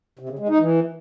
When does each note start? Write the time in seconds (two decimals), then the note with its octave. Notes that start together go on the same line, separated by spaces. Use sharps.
0.19 C3
0.29 C#3
0.39 G#3
0.49 D#4
0.59 E3